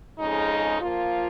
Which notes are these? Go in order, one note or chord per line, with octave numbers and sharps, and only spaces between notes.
F2 C#3 G#3 D#4
F3 A#3 F4